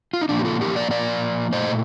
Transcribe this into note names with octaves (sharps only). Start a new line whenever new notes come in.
F4
D#4
A#2 F3 A#3 D4
G4
F4 A4
G4 A#4
A#4 D5
A#4 D5
A#2 A3 C5 D#5